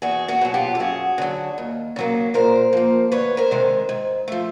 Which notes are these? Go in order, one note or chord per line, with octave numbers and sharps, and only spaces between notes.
E2 F#4 G#4
F#4 G#4
B2 F#3
F4 G4
A4
F#2 F#4 G#4
D3 F#3
D#2
C#3 F#3 A#3
A#2 A#4 C5
F3 A#3
D2 B4 C#5
A#4 C5
C3 D#3 G#3
G#2
F3 A3